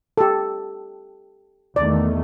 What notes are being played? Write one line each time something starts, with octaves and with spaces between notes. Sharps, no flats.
G4 A4
E2 D#3 A3 D5